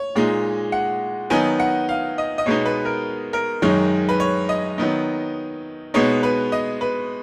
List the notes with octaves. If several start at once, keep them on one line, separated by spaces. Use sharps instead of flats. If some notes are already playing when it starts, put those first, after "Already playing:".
Already playing: C#5
A#2 G#3 D#4
F#5
D#3 F#3 B3 D#4 G#5
F#5
F5
D#5
D#5
B2 G#3 B3 D#4 C#5
B4
A#4
A#4
F#2 D#3 G#3 D#4 C#5
B4
C#5
D#5
D#3 F#3 B3 D#4
B2 G#3 B3 D#4 C#5
B4
D#5
B4